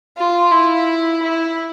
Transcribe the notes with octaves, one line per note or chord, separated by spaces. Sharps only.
F4
E4
E4